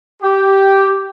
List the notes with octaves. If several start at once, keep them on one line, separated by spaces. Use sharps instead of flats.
G4